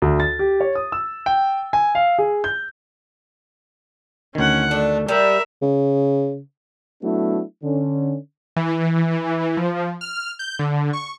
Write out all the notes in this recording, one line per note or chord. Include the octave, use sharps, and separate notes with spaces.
D2
A6
G4
C#5
D#6
E6
G5
G#5
F5
G#4
G6
D2 D#3 C#4 F#5
A3 D4
G3 A#4 E5
C#3
F#3 A3 B3 D4 E4 F#4
D3 C#4
E3
F3
F6
G6
D3
C#6